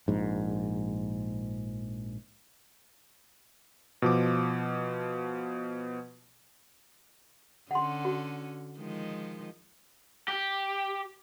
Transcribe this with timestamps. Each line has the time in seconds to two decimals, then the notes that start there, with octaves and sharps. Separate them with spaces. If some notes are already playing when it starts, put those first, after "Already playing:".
0.08 A#1 G#2
4.02 B2 F3 D6
7.71 D3 C#4 F#5 C6
8.05 F#4
8.78 D#3 F3 G#3
10.28 G4